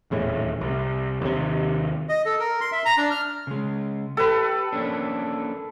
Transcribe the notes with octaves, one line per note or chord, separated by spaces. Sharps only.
D#1 E2 A2 E3
C2
D#2 C3
D#5
A4
A#4
C6
E5
A#5
D4
F6
C#3 G#3
G4 A4 B4
A#3 C#4 D4